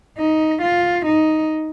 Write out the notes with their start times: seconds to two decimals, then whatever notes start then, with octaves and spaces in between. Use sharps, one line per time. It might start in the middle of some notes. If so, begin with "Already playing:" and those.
0.18 D#4
0.62 F4
1.05 D#4